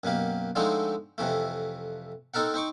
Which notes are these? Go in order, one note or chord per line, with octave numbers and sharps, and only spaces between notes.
F#2 B2 A#3 G4
D3 F3 G#3 A3 C4 D#4
F2 C3 E3 A3
C4 D#4 A4 A#4 F#5
C4 D#4 C#6 D6